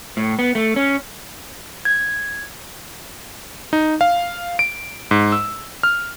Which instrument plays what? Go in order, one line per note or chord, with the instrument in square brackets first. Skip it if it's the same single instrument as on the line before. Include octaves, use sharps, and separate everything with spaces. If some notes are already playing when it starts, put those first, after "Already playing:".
[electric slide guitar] A2
B3
A3
C#4
[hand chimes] G#6
[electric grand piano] D#4
F5
D7
G#2
E6
F6